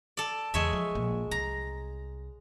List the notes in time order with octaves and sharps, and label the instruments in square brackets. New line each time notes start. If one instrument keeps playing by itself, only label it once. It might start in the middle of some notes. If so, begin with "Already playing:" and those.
[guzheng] A4 D5
[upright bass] E2 C#3 [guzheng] G#3 C#5 E5
[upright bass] F3
A#1 A#3
[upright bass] C2 [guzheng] A#5